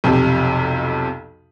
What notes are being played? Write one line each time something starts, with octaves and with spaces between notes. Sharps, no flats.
B1 F2 C3